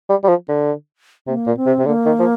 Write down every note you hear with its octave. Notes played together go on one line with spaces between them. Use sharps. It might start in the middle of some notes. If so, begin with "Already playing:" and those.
G3
G3
F3
D3
C3 A#3
A#2
C4
C3
C3
D3 A#3
D#3
F3